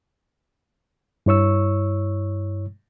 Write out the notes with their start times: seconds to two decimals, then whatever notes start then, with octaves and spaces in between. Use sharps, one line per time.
1.26 G2 E4 C#5 C#6 E6